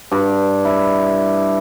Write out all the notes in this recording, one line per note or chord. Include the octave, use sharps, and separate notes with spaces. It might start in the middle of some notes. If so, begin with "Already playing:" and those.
G2
E4